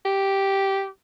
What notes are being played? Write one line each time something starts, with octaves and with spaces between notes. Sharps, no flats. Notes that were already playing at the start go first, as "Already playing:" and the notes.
G4